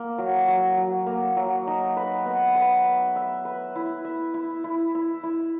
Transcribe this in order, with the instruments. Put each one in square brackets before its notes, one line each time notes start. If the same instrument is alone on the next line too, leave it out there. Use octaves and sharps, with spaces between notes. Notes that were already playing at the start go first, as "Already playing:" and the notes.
Already playing: [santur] A#3
F#3
F#3
F#3
A#3
F#3
D#4
B4
B3
B4
E5
E5
B4
E4
E5
E4
E4
E4
E4